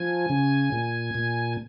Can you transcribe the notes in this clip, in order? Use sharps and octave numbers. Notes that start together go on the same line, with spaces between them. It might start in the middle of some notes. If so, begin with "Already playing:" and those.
Already playing: F3 G#5
C#3
A#2
A#2